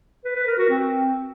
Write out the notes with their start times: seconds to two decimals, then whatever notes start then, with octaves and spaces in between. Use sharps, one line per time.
0.25 B4
0.36 B4
0.47 A#4
0.58 F#4
0.70 C4